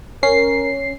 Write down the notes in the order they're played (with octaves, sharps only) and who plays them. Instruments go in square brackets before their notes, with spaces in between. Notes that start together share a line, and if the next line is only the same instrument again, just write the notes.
[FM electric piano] C#4 C7 [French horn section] A#4